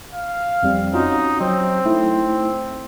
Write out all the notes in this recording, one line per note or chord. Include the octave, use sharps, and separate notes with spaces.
F5
F2 G3 C4
C#4 D#4 F4 F#4
F#3 C4
A3 D#4 E4